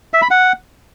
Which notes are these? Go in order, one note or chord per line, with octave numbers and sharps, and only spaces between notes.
E5
B5
F#5